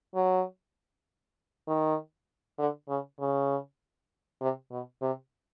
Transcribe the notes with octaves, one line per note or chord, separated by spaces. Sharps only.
F#3
D#3
D3
C#3
C#3
C3
B2
C3